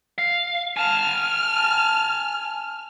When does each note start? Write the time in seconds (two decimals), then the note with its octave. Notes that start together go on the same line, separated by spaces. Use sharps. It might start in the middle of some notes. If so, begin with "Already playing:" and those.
0.18 F5
0.77 G#5 A5 F6